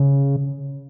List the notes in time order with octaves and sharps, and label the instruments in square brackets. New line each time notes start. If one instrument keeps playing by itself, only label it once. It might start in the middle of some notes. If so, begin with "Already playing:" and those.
Already playing: [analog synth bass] C#3